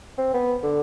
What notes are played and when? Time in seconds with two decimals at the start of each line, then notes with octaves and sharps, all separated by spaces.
0.18 C4
0.34 B3
0.63 D3